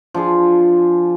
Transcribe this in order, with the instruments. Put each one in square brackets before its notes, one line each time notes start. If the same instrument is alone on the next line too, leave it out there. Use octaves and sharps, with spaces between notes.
[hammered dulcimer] F3 D4 G#4